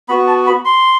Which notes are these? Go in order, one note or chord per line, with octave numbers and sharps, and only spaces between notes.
B3 F#4 B5
A5
B5
C6